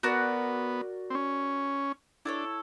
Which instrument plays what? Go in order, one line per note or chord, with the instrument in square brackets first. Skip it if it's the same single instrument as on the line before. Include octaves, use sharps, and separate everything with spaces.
[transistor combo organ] B3 [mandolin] F#4 A#4 D5
[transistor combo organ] C4
C#4
[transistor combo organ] D4 [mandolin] E4 A4 C#5